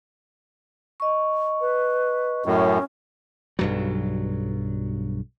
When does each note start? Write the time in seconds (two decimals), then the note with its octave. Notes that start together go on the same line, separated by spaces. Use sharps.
1.00 D#5 C#6
1.61 B4
2.46 F#2 A2 C#4
3.59 B1 G2 F#3